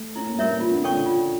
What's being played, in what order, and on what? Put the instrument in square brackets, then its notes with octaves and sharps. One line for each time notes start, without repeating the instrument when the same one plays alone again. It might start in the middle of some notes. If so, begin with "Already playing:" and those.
Already playing: [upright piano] A3
[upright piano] C#4 [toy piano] E4
[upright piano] A#3
[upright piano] G3 [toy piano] A#4 C#5 E5
[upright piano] E3
[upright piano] E3 [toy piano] F4
[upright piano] D3
[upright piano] C#3 [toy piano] A4 C#5 G5 C#6
[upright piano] D3
[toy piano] F4